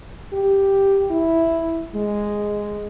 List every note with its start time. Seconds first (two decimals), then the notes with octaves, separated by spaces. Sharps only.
0.33 G4
1.11 E4
1.95 G#3